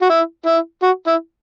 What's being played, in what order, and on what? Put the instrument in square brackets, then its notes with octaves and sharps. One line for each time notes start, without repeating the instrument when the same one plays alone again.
[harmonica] F#4
E4
E4
F#4
E4